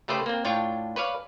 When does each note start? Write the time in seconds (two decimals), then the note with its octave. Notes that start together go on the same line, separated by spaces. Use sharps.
0.08 C#3 A3 G4 B4 C5
0.26 A#3 C4
0.45 A2 D4 F4 C#5 G5
0.96 B4 C#5 D5 F5